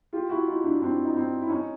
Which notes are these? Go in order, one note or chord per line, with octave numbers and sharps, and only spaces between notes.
F4 G4
E4 F#4
D#4 F4
D4 E4
C4 D4
D#4
C4 D4
E4
C#4 D#4